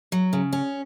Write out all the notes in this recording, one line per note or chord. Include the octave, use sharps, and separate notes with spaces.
F#3
C#3
C#4